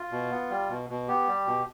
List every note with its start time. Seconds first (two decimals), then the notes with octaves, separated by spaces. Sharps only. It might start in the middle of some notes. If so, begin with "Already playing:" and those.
Already playing: F4
0.12 B2
0.32 B3
0.50 G3
0.69 B2
0.90 B2
1.08 B3 G4
1.27 G3
1.47 B2